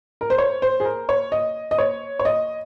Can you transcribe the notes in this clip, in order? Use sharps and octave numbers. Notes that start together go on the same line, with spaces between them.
A#4
C5
C#5
C5
G#4
A#4
C#5
D#5
D#5
C#5
C#5
D#5